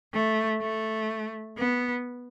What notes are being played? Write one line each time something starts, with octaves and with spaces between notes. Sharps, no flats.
A3
A3
B3